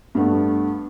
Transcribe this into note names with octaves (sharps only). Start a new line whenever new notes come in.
G2 A3 B3